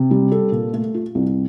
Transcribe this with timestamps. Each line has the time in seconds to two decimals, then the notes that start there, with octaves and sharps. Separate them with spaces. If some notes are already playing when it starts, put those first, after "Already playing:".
Already playing: C3
0.11 G3
0.32 A4
0.52 A#2
0.73 A3
0.94 F4
1.15 C2